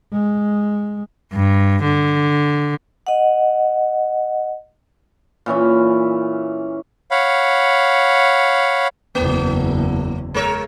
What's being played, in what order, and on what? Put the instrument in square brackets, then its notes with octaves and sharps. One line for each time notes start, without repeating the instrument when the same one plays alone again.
[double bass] G#3
[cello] G2
D3
[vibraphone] D#5 F#5
[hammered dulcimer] A#2 E3 C#4 E5
[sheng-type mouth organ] C#5 F5 F#5 B5
[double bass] F#1 E2 [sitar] A#3
[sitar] G#3 A#4 C#5